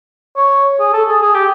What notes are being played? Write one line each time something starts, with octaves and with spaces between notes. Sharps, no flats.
C#5
G#4
A4
G#4
G#4
G4